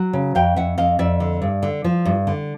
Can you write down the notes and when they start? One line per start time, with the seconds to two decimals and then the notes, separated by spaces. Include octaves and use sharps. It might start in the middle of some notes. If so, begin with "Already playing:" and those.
Already playing: F#3
0.13 C#3
0.35 F2 F5 G5
0.56 F2 E5 F#5
0.78 F2 D#5 F5
0.99 F2 D5 E5
1.20 D3
1.42 G2
1.63 D3
1.84 F3
2.05 G2
2.27 D3